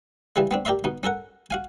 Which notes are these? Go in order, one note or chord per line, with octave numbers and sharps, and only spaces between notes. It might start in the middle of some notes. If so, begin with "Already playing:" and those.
C#3 E3 G3 G#3
B3 C4 D4
G4 A#4 D5 E5 C6
B2 D#4
C#4 A4 A#4 F#5
F#4 F5 G#5